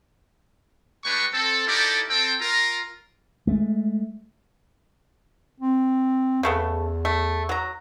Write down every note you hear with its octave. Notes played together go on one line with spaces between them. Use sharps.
G3 G#3 D4 B4 G5 C#6
C4 A4
D#4 E4 G4 A4 A#4 D5
C4 A4 G5
F4 A#4 A#5
G#3 A3
C4
E2 C#3 A3 B3
A3
F#3 A#5